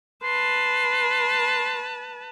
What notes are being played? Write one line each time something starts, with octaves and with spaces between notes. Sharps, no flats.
B4 A5 C6